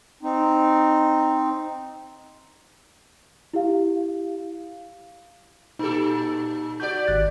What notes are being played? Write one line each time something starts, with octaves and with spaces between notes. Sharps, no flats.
C4 D#4
E4 G4 F5
A#2 D#4 G4 A4
F#4 G4 D5 G6
G#1 F#6 A6